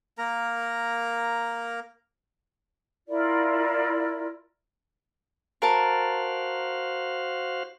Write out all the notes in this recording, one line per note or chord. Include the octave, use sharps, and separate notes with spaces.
A#3 A#4 A#5
E4 F4 A#4 D5
F#4 A#4 C5 F5 A5